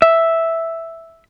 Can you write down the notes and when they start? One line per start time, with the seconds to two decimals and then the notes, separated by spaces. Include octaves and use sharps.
0.02 E5